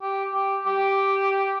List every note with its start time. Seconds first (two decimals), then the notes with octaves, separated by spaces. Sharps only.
0.02 G4
0.34 G4
0.66 G4